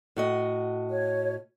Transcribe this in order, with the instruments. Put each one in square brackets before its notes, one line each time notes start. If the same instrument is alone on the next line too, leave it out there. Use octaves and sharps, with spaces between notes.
[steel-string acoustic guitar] A2 F#4 D#5
[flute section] C#5